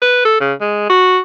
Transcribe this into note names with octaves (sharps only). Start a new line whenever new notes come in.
B4
A4
C#3
G#3
F#4